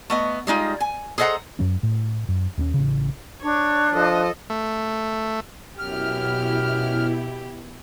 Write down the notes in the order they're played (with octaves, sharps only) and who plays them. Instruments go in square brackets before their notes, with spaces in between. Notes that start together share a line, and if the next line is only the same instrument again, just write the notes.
[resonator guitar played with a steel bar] A3 B3 D#5
G3 G#3 D#4 F4
G#5
G#4 A4 C5 D#5 F#5 A#5
[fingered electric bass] F#2 F#3 C#4
A2
F#2
D#2 A3 C#4
A1 C#3
[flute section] D4 [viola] C#5
[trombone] F3 [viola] A4 D#5
[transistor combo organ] A3
[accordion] F#2 F6 [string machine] B2 E4 [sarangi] G4